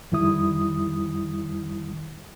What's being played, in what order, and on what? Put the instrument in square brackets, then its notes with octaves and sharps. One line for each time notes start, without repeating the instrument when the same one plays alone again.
[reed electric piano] F2 D#3 G3 E4 D#6